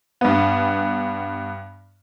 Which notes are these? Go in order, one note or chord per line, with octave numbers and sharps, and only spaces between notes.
G2 B3